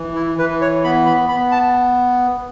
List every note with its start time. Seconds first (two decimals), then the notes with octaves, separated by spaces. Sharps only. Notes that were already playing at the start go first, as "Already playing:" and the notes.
Already playing: E3
0.15 E4
0.38 E3 B4
0.61 C#5
0.84 B3 B5
1.06 B5
1.29 B3 B5
1.52 A5